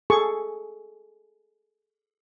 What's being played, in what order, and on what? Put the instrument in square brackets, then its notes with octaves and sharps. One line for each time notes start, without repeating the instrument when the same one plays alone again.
[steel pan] G#4 A4 C#6